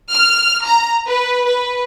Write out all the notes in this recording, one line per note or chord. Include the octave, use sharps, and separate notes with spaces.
F6
A#5
B4
B4